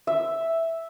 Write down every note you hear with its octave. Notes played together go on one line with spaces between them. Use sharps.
E5